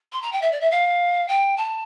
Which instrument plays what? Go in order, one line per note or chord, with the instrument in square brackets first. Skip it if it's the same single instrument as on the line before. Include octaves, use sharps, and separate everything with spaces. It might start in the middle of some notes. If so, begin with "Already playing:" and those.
[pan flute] C6
A#5
G5
E5
D5
E5
F5
G5
A5